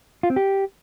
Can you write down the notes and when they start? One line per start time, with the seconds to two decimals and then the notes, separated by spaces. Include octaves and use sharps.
0.23 F4
0.30 C4
0.36 G4